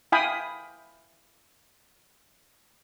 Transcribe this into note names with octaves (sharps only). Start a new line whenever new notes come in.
E4 F5 G5 G#5 B5 D#6